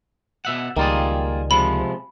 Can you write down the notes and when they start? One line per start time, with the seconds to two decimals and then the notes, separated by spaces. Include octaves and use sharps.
0.45 B2 E5 F#5
0.77 C#2 D#3 G3 A#3 F4 G#4
1.51 C3 F3 G#3 B5